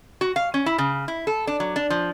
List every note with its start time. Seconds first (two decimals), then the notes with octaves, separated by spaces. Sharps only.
0.21 F#4
0.36 F5
0.54 C#4
0.66 E4
0.78 C#3
1.08 E4
1.27 A4
1.47 D4
1.60 F#3
1.76 D4
1.90 F3